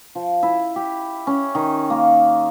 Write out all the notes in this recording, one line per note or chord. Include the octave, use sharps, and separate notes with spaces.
F3
E4
G4
C#4
D#3
A#3